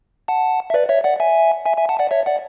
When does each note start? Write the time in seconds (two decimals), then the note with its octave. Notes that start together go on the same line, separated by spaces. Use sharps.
0.28 F#5 A5
0.70 E5
0.74 B4 D5
0.89 C#5 E5
1.04 D5 F#5
1.20 E5 G#5
1.66 E5 G#5
1.77 E5 G#5
1.89 F#5 A5
1.99 D5 F#5
2.11 C#5 E5
2.26 D5 F#5